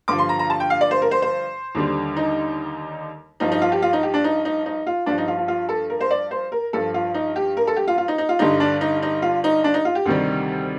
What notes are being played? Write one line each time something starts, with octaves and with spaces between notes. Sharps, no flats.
G2 D3 F3 D6
C6
A#5
A#5
A5
G5
F5
D5
C5
A#4
C5
C5
D#2 D3 G3
D#4
G2 F3 D#4
D#4
F4
G4
F4
D#4
G4
D4
D#4
D#4
D#4
F4
G2 F3 D4
D#4
F4
F4
F4
A4
A#4
C5
D5
C5
A#4
G2 F3 A4
F4
D#4
G4
A#4
A4
G4
F4
F4
D#4
D#4
F4
G2 D3 G3 D#4
D4
D#4
D#4
F4
D#4
D4
D#4
F4
G4
D2 C3 D#3 G3